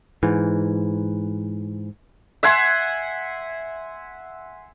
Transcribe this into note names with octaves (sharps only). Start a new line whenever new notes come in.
G#2 E3
E5 F#5 G#5 C6